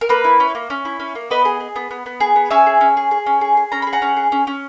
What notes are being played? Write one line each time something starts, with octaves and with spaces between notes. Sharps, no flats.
A#4
A#3 B4
E4
C#4
A#3
C#4
E4
C#4
A#3
B3 B4 D#5
G#4
G#4
B3
B3
B3
G#4
B3
C#4 E5 G#5
G#4
C#4
G#4
G#4
C#4
G#4
G#4
C#4 A#5
G#4 B5
F#5 A#5
C#4
G#4
C#4
C#4